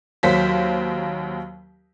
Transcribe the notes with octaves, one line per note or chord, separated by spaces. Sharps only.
D#2 F#3 C5 F5 B6